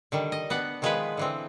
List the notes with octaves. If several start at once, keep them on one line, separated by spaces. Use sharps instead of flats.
D3 D#3 G3
D#5
B3 D4 F#5
D#3 F3 G#3 B3 G#4 B4
D3 E3 C4